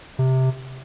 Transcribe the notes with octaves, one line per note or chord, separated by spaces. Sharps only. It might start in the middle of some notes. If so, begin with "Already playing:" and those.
C3